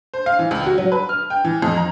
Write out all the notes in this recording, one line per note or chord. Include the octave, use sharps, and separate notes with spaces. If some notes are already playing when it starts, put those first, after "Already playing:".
C5
F5
E3
C#2
F#4
F#3
B4
F6
G5
E3
F2
A#5